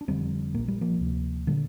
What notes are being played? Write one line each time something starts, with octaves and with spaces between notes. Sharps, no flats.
D4
F1 F2 D3 G3 C4
A#1 A#2 A#3
G3
F3 A#3
D2 C3
A#2 D3 G3